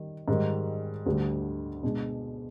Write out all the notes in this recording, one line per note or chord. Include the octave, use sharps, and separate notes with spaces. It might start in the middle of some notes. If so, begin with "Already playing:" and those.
Already playing: D#3 G3
G#2 D#3 G3
D2 D3 G3
B2 G#3 D4